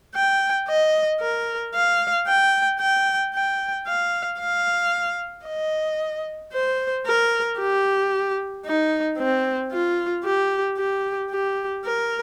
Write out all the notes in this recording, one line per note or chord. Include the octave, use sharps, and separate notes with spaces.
G5
D#5
A#4
F5
G5
G5
G5
F5
F5
D#5
C5
A#4
G4
D#4
C4
F4
G4
G4
G4
A#4